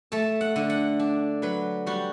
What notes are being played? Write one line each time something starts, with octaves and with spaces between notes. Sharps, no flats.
A3 A5
F#5
D3
F#5
D4
F#3 B4
G3 F#4